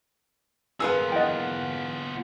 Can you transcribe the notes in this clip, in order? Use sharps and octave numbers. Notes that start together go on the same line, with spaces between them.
B3 F4 G#4 A#4 B4 E6
E3 D#5 F#5 G5 A6